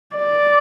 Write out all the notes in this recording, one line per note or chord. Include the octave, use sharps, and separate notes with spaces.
D5